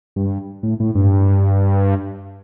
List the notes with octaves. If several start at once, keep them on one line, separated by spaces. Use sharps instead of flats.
G2
A2
A2
G2